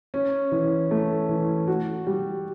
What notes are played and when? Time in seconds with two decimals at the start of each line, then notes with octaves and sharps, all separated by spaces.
0.14 C#4
0.52 E3
0.91 A3
1.29 E3
1.68 F#4
2.07 G3